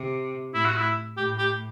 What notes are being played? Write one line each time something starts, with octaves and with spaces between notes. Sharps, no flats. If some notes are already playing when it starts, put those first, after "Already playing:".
Already playing: C3
A2 E4
F#4
E4
A2 G4
G4